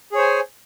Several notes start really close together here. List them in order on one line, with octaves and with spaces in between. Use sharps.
G#4 C#5 C5 G#5